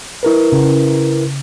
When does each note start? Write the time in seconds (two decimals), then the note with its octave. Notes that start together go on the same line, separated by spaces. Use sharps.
0.23 E4 A#4 B4
0.52 C#3